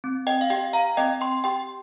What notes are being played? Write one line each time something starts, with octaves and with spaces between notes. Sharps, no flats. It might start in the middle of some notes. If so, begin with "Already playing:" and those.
C4
D#5 G5
F5
G4 D#5 G5
F5 A#5
C4 D#5 G5
G5 C6
G4 G5 C6